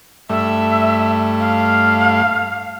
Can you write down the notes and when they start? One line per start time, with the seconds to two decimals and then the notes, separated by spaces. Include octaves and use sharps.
0.29 G2 A3 E5
1.40 F5